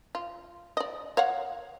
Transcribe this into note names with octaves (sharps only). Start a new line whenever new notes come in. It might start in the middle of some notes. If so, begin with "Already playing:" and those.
F4
D5 D#5
C#5 F5 F#5